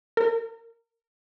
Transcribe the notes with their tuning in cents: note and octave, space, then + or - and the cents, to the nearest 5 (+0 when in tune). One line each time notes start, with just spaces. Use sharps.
A#4 -25